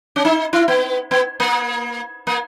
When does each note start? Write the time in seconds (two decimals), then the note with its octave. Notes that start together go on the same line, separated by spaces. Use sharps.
0.16 C#4
0.25 D#4
0.53 E4
0.68 B3
1.11 B3
1.40 A#3
2.27 A#3